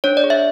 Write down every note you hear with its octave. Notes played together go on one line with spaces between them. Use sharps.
D4 C#5
D5
G#4
E5